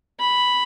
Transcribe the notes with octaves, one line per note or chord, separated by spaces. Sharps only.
B5